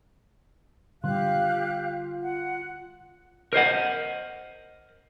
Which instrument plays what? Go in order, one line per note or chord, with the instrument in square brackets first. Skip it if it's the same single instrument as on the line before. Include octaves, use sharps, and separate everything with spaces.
[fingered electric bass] D3 G3 [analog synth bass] F4 [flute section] G4 F5 F#6
[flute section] F#5
[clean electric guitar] A#4 C5 D#5 F#5